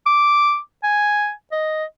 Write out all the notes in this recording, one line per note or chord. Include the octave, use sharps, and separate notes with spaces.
D6
G#5
D#5